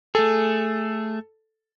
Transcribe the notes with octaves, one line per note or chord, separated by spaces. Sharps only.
A3 G#4 A4